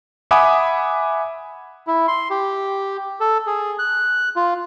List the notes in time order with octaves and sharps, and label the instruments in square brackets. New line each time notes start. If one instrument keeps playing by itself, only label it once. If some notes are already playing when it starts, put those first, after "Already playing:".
[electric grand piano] E5 F#5 G#5 B5 D6 D#6
[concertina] E4
C6
G4
A4
G#4
F#6
F4